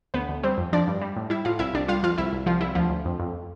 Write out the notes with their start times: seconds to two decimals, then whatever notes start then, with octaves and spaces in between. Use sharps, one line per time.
0.14 D2 B3 B4
0.29 D2
0.43 G3 C4 C5
0.58 F2
0.73 F3 D4 D5
0.87 G2
1.01 G3
1.16 A2
1.30 G3 E4 E5
1.45 A2 F4 F5
1.59 C2 E4 E5
1.74 C2 D4 D5
1.88 G3 F4 F5
2.03 F2 F4 F5
2.18 C2 E4 E5
2.33 C2
2.46 C2 F3 F4
2.61 C2 E4
2.75 D2 F3 F4
2.90 D2
3.05 F2
3.20 F2